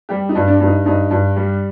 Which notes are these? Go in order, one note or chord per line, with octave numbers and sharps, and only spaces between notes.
G3 G4
D#4
G2
D4
G2
D#4
G2 D#4
G2
G3